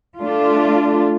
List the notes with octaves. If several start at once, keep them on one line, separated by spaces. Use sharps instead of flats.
A3 D4 F4